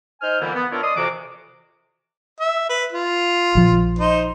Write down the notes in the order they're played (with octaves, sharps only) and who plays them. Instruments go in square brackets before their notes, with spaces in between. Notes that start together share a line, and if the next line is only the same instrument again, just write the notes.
[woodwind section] D#4 C5 G#5 F6
A#2 D3 E3 G3 A#3 B3
B3
D4 F4 A#4 C#5 D5 E5
D5 D#5 C6 D#6
F2 C3 E3 F#4 D6
[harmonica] E5
B4
F4
[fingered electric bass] A#1 F3
[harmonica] D#4 C5